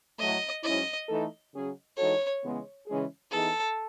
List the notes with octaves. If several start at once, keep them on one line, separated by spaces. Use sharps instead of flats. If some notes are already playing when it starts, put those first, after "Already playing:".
A2 F#3 A3 D#5
G#2 F#3 C#4 E4 D#5
E3 A3 D#4 A4
C#3 F#3 C#4 G#4
E3 G#3 D#4 F#4 A4 C#5
C#3 E3 G#3 B3
C#3 E3 G#3 C#4 G#4
E3 B3 D#4 G#4 A4